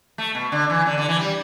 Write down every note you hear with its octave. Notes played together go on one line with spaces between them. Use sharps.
A3
B2
D3
E3
D3
D3
E3
G3